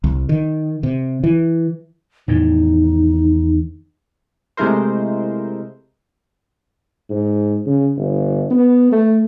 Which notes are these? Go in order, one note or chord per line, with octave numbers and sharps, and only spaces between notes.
C2
D#3
C3
E3
E2 A2 D#3 D#4
C3 G#3 A3 E4 A#4 C5
G#2
C#3
G1
B3
A3